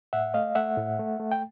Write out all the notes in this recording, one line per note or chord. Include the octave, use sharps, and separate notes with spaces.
A2 E5 F#5
A3 D#5 F5
A3 E5 F#5
A2
A3
A3
G5